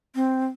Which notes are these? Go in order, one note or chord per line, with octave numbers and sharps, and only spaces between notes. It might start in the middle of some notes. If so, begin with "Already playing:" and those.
C4